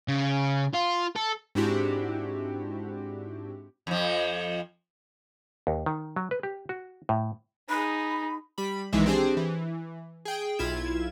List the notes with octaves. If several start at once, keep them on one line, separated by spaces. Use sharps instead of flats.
C#3
F4
A4
G#2 C4 D4 E4 F#4 G4
F2 F3
D#2
D#3
F#3
B4
G4
F#4
A2
D#4 G#4 B5
G3 B5
B1 D#3 E3 G#3 E5
C4 D4 G4 G#4 C5
E3
G#4 G5
B1 E4 F4 G#6 E7